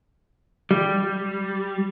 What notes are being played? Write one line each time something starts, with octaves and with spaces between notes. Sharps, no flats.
G3